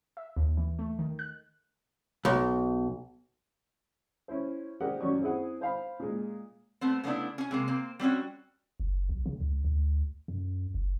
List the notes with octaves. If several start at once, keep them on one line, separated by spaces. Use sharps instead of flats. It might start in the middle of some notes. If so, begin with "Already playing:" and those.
E5
D#2
E3
A3
D#3
F#6
B1
C#4 E4 C5
G4 G#4 A#4 C5 D5 F#5
A1 F#2 C#4 F#4 D5 C#6
C4 E4 G#4 F#5
C5 F5 B5
A#2 G#3
A3 B3 C4
C#3 A3 B3 D4 E4
C#4 G#5
C3 G#3 A#3
A#3 C4
G3 C4 C#4 F#4
F#1
B1
C#3
C#2
D2
F#2
F#1